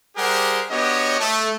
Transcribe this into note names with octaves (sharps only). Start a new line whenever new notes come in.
G3 G4 G#4 A#4 C5 F#5
B3 D4 F#4 G4 C#5 D#5
A3